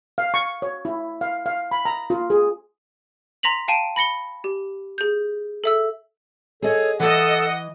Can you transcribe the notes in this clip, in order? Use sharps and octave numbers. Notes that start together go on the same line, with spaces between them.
F5
C#6
C#5
E4
F5
F5
B5
A#5
F4
G#4
A#5 C6 A#6 B6 F7 F#7
F5 G5 A5 D7 D#7
B5 A#6 C#7 G7
G4
G#4 G6
A4 E5 E6
G#4 A4 C#5 D#5
E3 A4 D#5 F#5